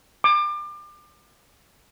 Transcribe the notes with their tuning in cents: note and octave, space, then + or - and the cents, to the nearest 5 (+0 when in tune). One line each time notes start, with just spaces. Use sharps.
D6 +30